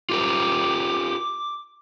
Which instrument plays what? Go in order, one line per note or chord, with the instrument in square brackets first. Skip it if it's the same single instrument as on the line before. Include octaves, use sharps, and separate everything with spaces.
[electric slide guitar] F4 G4 A#4 [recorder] D6